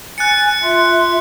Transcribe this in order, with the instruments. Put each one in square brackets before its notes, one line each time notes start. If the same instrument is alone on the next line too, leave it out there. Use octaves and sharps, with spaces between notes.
[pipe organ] G#5 A6 [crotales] F#6 C#7
[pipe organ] F4 E5 C6